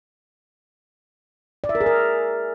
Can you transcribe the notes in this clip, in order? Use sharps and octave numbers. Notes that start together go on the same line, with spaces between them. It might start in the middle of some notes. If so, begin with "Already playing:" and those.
D5
E5
A#4
G#4
A#4